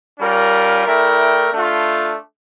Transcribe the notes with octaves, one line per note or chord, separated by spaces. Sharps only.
G3 C#4 F4 A#4
A3 E4 A#4 D5 G5
A3 D4 F4